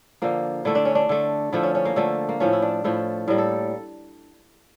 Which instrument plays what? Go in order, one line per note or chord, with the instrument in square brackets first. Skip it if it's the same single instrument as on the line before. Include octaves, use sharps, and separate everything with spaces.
[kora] D3 F3 A#3
D3 A3 E4
D4
C#4
D4
D3 A3
D3 F3 A3 E4
C#4
C#4
A#3
D3 F3 A3
A#3
A2 F3 A3 C#4
E4
D4
A2 F3 A3 E4
A2 G3 A#3 A#4
A4